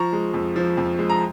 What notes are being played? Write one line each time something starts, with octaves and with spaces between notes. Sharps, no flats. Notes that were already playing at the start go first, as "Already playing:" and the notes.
Already playing: F3 A#5 C#6
G#3
F2
F3
F2
G#3
A#5